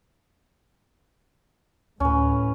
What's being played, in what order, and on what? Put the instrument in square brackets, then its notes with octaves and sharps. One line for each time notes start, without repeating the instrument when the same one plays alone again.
[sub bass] D2 [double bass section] A2 [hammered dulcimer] C#4 B4